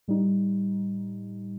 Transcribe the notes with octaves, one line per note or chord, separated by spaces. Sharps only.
A2 G3 D#4